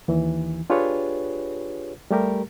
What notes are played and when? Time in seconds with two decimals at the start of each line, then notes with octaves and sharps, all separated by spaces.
0.08 D#2 E3
0.70 D4 F4 G4 G#4 B4 C#5
2.11 G3 A3 G4 A#4